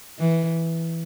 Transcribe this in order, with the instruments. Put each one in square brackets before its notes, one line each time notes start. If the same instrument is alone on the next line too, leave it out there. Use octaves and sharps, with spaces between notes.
[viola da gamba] E3